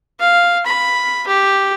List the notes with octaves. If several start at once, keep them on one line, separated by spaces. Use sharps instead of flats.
F5
B5
G4